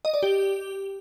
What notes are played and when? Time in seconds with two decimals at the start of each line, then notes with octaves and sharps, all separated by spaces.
0.05 D#5
0.14 D5
0.23 G4